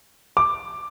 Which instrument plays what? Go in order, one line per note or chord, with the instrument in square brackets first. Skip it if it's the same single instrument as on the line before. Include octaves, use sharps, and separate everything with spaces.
[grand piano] D6